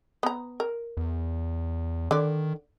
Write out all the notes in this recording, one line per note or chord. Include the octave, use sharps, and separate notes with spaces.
B3 A#5
A#4
E2
D3 D#3 D5